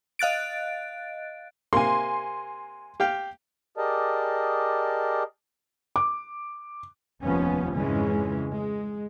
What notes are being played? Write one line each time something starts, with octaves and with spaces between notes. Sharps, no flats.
D#5 F5 F#6 A6 D7
C3 A#3 G#5 C6
G4 F5 G5
G4 G#4 A#4 D5 D#5 A5
D6
F1 D#2 F3 B3 C#4
F2 G#2 C#3 E3 G#3 C#4
G#3